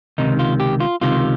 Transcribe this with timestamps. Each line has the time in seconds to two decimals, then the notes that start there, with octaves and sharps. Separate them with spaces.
0.18 C#2 C3 D#3 D#4
0.39 F4
0.60 G4
0.80 F4
1.01 C#2 C3 D#3 F4